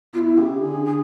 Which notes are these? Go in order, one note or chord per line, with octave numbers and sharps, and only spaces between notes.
B2 E4 F4
C#3 G4 G#4
D3 G#4
G#4